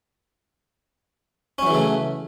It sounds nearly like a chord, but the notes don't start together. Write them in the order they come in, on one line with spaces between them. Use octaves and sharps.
C#4 F#3 E3 C#3 A3